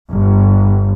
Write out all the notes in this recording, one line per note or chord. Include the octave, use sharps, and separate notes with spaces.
G1